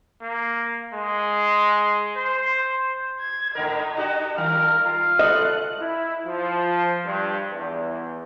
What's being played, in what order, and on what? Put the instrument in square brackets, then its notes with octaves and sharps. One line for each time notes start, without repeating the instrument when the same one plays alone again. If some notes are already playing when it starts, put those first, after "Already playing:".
[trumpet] A#3
G#3
C5
[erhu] G#6
[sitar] G#2 D3 A#4 [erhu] D#4
[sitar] D4 F#4 G4
[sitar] D#3 G3 [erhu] A#4 [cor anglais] F5
[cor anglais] F4
[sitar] G2 A4 [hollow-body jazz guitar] D#5 [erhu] F#6
[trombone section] E4
F3
G2
E2